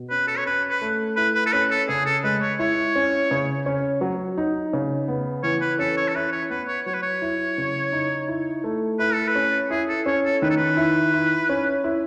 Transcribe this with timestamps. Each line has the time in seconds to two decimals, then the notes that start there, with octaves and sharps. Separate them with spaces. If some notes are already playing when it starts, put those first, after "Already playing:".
Already playing: B2
0.10 C#4 B4
0.28 A4
0.38 C#5
0.46 C#4 B4
0.70 B4
0.82 A3
1.16 E4 B4
1.35 B4
1.46 A4
1.52 C#4 B4
1.71 A4
1.89 C#3 G#4
2.06 A4
2.24 G#3 B4
2.42 C#5
2.59 E4 C#5
2.96 C#4
3.31 C#3
3.66 C#4
4.01 F#3
4.38 D#4
4.73 C#3
5.08 B3
5.43 E3 C#5
5.61 B4
5.79 C#4 A4
5.97 C#5
6.08 A4
6.15 E4 B4
6.32 C#5
6.50 B3 B4
6.68 C#5
6.86 F#3 C#5
6.94 B4
7.03 C#5
7.22 E4
7.58 C#3
7.92 D#4
8.28 E4
8.64 A3
8.99 E4 B4
9.14 A4
9.28 B4
9.35 C#4
9.71 E4 G#4
9.89 A4
10.06 C#4 C#5
10.25 A4
10.42 D#3 B4
10.50 A4
10.57 B4
10.77 E4
11.14 E4
11.49 C#4
11.84 E4